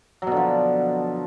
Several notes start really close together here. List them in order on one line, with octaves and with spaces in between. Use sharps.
F#3 B2 D3 F3